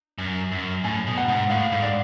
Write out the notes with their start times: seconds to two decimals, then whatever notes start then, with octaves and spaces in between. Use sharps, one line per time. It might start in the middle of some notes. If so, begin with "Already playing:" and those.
0.18 F#2
0.52 F#2
0.84 A2 G#5
1.07 B2
1.18 F#5
1.28 G#2
1.50 A2 F5
1.72 G#2
1.82 D5